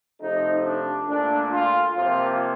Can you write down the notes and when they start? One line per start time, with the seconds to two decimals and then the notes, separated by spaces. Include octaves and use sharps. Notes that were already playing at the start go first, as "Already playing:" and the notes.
0.20 C3 F3 A3 D#4
0.65 D4
1.08 A#2 A3 D4
1.51 F4
1.95 C3 F3 A#3 F4